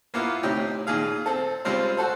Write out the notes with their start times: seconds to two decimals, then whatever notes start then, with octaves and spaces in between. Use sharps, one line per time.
0.14 A#3 B3 E4 F4
0.43 D2 C3 C#4 D#4 G5
0.87 A#2 D#3 G#4 F5
1.26 C4 A4
1.65 C#3 G3 G#3 C4 F4 C5
1.97 F#4 A4 C5